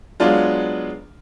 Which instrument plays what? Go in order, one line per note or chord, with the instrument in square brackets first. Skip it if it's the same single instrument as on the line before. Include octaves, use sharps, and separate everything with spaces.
[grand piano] F#3 G#3 B3 D4 F4